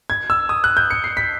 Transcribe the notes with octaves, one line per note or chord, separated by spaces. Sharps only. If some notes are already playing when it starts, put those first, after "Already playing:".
G#6
E6
D#6
F#6
G6
C#7
C7
B6